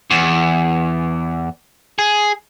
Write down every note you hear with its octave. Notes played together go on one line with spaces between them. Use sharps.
E2
G#4